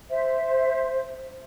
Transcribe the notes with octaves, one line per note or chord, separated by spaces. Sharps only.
C5 E5